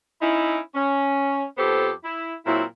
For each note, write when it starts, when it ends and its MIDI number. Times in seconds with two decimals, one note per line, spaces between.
0.21 0.59 61
0.21 0.59 63
0.21 0.59 64
0.75 1.44 61
1.58 1.91 41
1.58 1.91 59
1.58 1.91 67
1.58 1.91 69
1.58 1.91 72
2.04 2.34 64
2.46 2.63 46
2.46 2.63 54
2.46 2.63 60
2.46 2.63 64